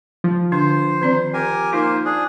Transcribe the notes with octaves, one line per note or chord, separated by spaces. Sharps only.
F3
D3 D4 C5
D#3 C4 D5
G4 A#4 G#5
A#3 D#4 F4 C5
D4 G#4